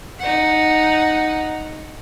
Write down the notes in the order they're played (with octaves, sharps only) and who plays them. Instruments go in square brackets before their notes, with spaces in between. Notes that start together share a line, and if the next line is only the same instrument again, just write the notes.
[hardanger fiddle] D#4 F#5